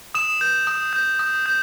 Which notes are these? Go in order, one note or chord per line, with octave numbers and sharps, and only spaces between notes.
D#6 E7
G6
D#6
G6
D#6
G6